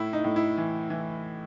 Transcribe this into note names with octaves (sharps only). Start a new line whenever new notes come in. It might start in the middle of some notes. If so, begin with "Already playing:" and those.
Already playing: A2 E4
D#4
A2
E4
E3
E3